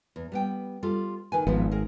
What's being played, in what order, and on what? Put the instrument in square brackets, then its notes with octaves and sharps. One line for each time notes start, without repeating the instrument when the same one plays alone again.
[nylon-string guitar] E2
G3 B3 G5
G3 F4 A4
D#3 B4 G#5
[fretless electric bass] G#1 [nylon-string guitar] E3 F3 B3
[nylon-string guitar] G#4 A#4